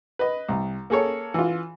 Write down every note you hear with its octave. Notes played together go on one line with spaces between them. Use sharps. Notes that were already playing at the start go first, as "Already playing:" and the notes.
B4 D#5
C2
A#3 G#4 A4 C#5
E3 F4